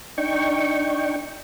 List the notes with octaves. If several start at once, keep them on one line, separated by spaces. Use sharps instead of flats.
D4 D#4 G5 C#6